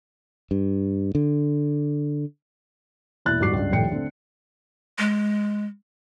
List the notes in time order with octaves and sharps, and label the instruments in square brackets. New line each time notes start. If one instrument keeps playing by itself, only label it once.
[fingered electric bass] G2
D3
[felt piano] E1 A#2 E4 F#6 A6
D#1 G#2 G3 F#4 D6 C7
C#2 G2
D#1 A#1 D#2 A2 G5 C#7
D3 A3 C4
[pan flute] G#3